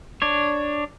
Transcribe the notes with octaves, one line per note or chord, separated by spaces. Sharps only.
D4 C#5